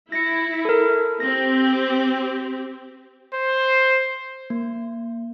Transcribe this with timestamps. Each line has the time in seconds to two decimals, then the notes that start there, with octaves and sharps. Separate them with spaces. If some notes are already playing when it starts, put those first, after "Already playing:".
0.12 E4 A#6 C#7
0.65 A4 A#4
1.20 C4 G4 A#6
3.34 C5
4.50 A#3